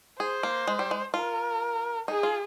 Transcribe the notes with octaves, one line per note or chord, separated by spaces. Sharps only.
G#4 C5
A#3
G#3
G3
G#3
F4 A#4
D#4 G#4
F4